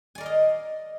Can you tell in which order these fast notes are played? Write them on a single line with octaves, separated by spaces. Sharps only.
G#5 D5 A#4 F5 D#5